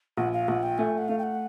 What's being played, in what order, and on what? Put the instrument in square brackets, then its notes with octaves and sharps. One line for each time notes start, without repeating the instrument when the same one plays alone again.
[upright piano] A#1 [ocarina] F#5
[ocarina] F5
[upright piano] A#1 [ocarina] F#5
[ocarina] G5
[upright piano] A3 [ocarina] G#5
[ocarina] F#5
[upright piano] A3 [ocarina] F5
[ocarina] G5
F#5